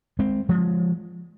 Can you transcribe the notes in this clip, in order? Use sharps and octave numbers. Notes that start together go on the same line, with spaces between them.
G#3 C4
F3 G#3